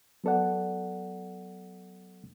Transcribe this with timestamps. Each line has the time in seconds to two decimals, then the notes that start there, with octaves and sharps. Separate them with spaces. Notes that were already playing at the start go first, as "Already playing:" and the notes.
0.24 F#3 B3 A4 D5 F#5